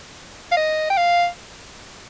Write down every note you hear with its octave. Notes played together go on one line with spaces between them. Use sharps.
F5
D#5
G5
F5